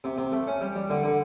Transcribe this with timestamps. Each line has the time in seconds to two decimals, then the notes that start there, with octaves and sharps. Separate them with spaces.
0.04 C3
0.18 C3
0.32 A3
0.47 C#4
0.61 G3
0.76 G3
0.90 D3
1.04 D3